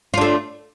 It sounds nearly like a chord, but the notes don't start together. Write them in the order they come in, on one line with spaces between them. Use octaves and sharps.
F4 D4 A3